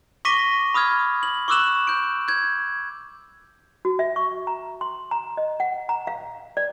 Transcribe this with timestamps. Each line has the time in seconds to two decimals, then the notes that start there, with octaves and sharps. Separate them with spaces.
0.25 C#6 D6 A#6 B6 D#7 G7
0.74 B5 D#6 F6 G#6
1.23 F#7
1.48 C#6 D6 E6 F#6 E7 F#7
1.87 G6 D7
2.28 G6 G#6
3.85 F#4
3.99 E5
4.16 C#6
4.47 A#5
4.81 C6
5.11 A#5
5.37 D#5
5.60 F#5
5.89 A#5
6.07 F5
6.57 D5